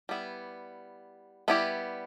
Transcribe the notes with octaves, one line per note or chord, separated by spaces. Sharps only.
G3 B3 E4
G3 B3 E4 G4